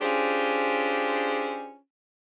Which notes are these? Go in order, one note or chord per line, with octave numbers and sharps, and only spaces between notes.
C#4 D4 F4 G4 G#4 C5